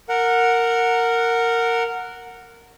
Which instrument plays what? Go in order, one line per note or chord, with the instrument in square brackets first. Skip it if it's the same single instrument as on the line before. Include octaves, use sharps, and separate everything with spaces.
[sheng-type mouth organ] A#4 F#5